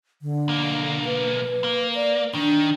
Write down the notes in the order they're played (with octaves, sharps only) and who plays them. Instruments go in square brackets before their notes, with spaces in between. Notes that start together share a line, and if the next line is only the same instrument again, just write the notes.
[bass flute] D3
[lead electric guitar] B1 A#3
[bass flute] B4
[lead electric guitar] A#3
[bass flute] D5
[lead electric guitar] D#3 [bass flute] D4